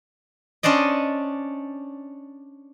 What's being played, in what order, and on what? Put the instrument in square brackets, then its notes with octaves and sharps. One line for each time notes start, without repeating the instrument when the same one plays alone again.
[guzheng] C#4 D4 C5 D5 D#5